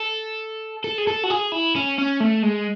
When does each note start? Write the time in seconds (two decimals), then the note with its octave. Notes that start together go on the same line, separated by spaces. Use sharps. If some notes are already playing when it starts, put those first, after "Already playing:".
Already playing: A4
0.84 A4
0.98 G#4
1.07 A4
1.24 F#4
1.30 G#4
1.52 E4
1.76 C#4
1.98 C#4
2.20 A3
2.43 G#3